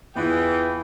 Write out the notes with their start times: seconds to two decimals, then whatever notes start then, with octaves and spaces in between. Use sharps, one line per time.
0.16 E2 E3 E4 F4 G#4 B4 G5